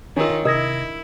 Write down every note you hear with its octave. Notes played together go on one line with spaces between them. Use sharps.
D#3 D4 F4 A#4 C#5
C3 E4 A#4 D#5 G#6 A#6